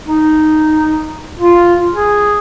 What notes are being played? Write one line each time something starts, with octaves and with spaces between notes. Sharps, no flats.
D#4
F4
G#4